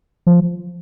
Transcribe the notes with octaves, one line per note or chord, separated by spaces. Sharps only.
F3